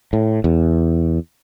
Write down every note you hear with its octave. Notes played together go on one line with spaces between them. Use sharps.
A2
E2